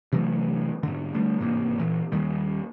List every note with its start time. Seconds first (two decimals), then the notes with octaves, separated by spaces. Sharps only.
0.12 C3 E3 F#3 A3
0.83 G#2 D3
1.14 D3 G3 A3
1.40 A1 G#2 C3 A#3
1.78 A#2 E3
2.12 D#2 D#3 G3